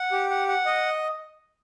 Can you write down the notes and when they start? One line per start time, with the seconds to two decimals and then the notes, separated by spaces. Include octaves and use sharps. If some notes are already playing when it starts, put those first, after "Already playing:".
Already playing: F#5
0.12 G4
0.30 F#5
0.48 F#5
0.66 D#5